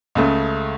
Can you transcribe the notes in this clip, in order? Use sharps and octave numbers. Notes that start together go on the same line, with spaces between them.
C#2 C#3 A3